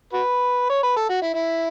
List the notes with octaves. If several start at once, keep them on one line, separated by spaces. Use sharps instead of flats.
F#4 B4
C#5
B4
A4
F#4
E4
E4